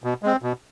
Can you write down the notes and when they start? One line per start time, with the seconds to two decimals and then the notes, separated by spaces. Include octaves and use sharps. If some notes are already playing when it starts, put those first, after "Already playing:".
0.04 B2
0.23 G#3 C4
0.43 B2